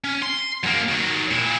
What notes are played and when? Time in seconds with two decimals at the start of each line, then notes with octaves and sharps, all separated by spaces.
0.04 C#4
0.22 C6
0.63 F#2 A#3
0.89 D#3 F#3
1.31 A#2 E4